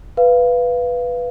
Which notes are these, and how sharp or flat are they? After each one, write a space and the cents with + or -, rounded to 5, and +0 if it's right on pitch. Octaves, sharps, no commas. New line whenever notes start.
B4 +0 F5 -10